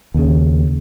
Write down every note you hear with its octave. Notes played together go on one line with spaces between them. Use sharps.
D#2 C#3